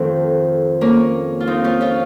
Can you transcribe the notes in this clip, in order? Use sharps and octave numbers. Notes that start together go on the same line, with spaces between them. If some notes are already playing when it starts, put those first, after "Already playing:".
Already playing: F2 D#3 A3 C4
A#3 C#4
F4
C4 D#4
C#4 F4
C#4 F4